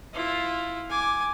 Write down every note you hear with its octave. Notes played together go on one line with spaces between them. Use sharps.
E4 F4
G#5 D6